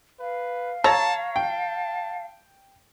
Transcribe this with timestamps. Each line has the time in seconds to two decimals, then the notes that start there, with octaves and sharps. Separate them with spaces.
0.19 B4 F5
0.84 A4 C#5 A5 A#5
1.36 G5 A5